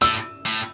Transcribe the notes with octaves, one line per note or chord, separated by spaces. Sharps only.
A2 E6
A2